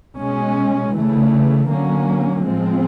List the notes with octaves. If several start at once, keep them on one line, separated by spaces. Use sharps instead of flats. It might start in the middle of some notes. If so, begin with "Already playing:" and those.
B2 G#3 C#4
C#3 E3 A3
D3 F#3 A#3 C#4
A2 F3 G#3 C4